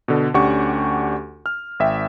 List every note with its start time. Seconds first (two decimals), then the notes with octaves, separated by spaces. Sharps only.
0.08 B2 D3
0.34 D2 C#4 D4 G4 F#5 C#6
1.46 F6
1.80 G#1 E5 G5